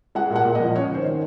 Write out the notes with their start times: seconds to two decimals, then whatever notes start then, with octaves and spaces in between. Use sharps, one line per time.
0.15 G#3 F#5
0.30 A#2
0.35 F#5
0.45 A#2
0.55 D#5
0.60 F3
0.75 C#4 C#5
0.90 D#3 C5
1.06 D#3